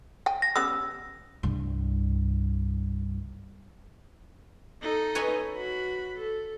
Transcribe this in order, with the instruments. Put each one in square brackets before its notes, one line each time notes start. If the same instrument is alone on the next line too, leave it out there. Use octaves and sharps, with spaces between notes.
[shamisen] G5 G#5
[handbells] A#6
[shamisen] G3 B3 C#4 [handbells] E6
[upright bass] C2 G2
[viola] D#4 A4
[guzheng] B4 C#5 G#5
[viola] F#4 B5
A4